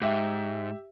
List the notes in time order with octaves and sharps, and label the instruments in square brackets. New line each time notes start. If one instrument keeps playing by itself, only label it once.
[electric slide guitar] G#2 [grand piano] G4 E5